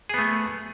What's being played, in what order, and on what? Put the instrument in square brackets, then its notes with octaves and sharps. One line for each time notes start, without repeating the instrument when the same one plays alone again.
[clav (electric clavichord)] G#4
B3
A3